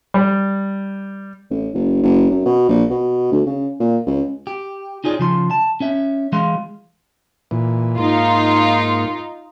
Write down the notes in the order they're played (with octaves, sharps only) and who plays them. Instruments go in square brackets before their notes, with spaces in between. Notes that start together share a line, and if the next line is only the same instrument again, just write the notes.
[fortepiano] G3
[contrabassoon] A1
F#1
F#1
F#2
B2
A#1
B2
D2
C#3
A#2
C#2
[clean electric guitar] G4
D#4 F4 G#4 C#5 D5
C#3 F3 C6
A5
C#4 C#5 E5
E3 G#3 F5 C6
[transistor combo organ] A#2 E3
[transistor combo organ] G#2 A#3 [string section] D#4 F4